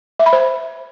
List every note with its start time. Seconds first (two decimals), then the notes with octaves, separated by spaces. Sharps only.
0.19 E5
0.26 B5
0.33 C5